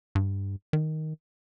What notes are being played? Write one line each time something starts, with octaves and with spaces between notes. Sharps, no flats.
G2
D#3